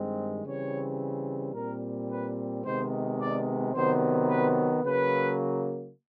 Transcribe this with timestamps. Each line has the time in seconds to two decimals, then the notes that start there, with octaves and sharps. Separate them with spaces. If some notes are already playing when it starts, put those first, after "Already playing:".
Already playing: G2 D#3 G#3 C4
0.44 C#3 E3 G3 C4 C#5
1.54 A#2 G3 C4 A#4
2.09 B4
2.64 C3 D#3 G#3 B3 C5
3.18 D5
3.73 C3 D#3 F#3 B3 C5
4.28 B4
4.83 C#3 F#3 A#3 B4